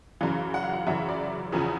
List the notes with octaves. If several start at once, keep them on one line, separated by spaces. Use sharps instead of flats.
F#2 C#3 E3 F5
F#5
F5
F#5
F#2 C#3 E3 E5
D5
E2 C#3 F3 G#4